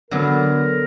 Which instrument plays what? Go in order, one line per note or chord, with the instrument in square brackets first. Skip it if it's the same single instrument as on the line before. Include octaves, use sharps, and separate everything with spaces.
[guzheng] D3 F#3 B3 [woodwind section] A#4